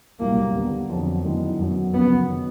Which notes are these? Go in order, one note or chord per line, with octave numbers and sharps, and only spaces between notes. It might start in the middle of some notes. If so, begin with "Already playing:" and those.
C2 A#2 F#3 A#3
D#2 D3 G3 B3
F2 D3 F#3
F#2 D#3 G#3 B3 E4
F#2 D3 F#3 B3
F#2 C#3 F3 B3
D#3 F#3